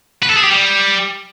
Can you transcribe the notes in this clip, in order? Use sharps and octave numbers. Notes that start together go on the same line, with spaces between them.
B4
A4
G#4
G4
G3